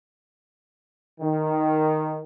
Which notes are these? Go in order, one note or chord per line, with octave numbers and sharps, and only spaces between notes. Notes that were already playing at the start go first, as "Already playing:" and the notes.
D#3